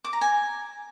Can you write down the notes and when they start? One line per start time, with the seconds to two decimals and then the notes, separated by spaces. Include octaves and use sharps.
0.04 D6
0.13 A#5
0.21 G#5